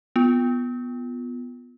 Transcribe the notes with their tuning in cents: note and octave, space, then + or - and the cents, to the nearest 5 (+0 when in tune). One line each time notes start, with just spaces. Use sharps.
B3 +0 F4 +0